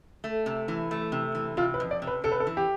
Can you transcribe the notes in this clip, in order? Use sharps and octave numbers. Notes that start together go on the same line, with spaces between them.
A3
C3
E3
A3
C3
E3
C3 F4
B4
F2
D5
C3
B4
C3 A4
B4
A4
E3
G4